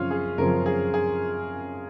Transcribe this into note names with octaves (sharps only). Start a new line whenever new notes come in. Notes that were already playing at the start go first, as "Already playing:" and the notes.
Already playing: F#2 C#3 F3 C4 C#4 F4
G#4
F#2 C#3 F3 C4 A#4
G#4
G#4